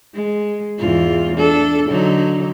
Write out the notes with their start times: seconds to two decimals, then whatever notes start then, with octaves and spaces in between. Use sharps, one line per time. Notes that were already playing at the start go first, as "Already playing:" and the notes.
0.14 G#3
0.78 E2 G#2 F4
1.36 D4 A4
1.89 D3 F#3 D#4